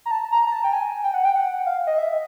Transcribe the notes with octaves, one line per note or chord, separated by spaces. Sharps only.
A#5
A5
A#5
A#5
A5
G5
G#5
G5
F#5
G5
F#5
F5
D#5
E5